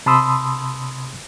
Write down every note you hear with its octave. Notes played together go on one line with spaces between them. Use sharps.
C3 A5 B5 C6 D#6 E6